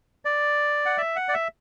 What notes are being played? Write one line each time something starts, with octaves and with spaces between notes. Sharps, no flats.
D5
F#5
E5
F#5
D5
E5